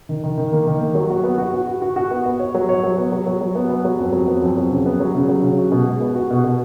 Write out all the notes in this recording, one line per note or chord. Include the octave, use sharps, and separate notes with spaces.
D#3
D#3
D#3
A#3
D#3
A#3
F#3
F#4
B3
F#4
F#4
F#4
F#4
F#4
B3
B3
C#5
F#3
C#5
F#3
B3
F#3
F#3
F#3
B3
B3
F#3
F2
F#3
B3
F2
F#3
C#3
B3
F#3
C#3
F#3
C#3
F#4
B2
G#3
B3
F#4
B2
B2